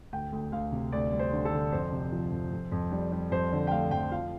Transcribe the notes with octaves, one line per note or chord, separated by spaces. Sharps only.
D2 G5
D2
D2 F5
C3
D2 D5
G3
C5
D3
A4
D3
F2 C5
C3
F3
F2
F2
F2
G3
G3
F2 C5
D3
G5
A3 F5
F2 G5
F3 F5